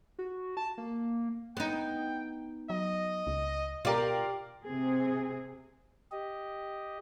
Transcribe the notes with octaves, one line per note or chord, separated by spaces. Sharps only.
F#4
A5
A#3
B3 D#4 G5
F#3 D#5
C#2
B2 F4 G4 A#4 D5 F5
C3 C4 G#4
G4 D#5